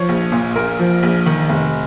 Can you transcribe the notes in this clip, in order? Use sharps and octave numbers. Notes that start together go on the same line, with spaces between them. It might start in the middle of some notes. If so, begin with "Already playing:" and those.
Already playing: F3 C#5
A#1
A#2
A#1 A#4
F3
A#1
D#3
F1